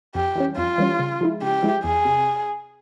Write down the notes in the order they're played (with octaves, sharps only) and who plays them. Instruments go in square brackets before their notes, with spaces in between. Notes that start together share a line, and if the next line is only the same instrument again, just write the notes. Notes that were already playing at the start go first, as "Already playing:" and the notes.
[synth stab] F2 [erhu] G4
[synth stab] E3 G3 C#4
[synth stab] F2 [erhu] F4
[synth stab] E3 G3 C#4
C#3
F3 G#3 E4
[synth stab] C#3 [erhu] G4
[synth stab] F3 G#3 E4
[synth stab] E2 [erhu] G#4
[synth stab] C3